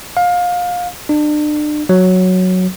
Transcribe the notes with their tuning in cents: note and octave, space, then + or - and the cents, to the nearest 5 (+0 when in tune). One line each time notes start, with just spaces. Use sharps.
F5 +25
D4 +35
F#3 -5